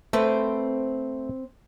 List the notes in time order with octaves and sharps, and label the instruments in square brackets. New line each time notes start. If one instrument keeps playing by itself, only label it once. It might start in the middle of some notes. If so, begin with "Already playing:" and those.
[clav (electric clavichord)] A3 [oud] C4 B4